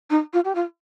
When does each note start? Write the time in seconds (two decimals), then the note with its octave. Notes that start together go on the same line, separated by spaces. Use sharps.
0.10 D#4
0.33 F4
0.45 G4
0.55 F4